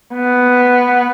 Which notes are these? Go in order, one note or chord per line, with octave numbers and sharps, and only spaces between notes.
B3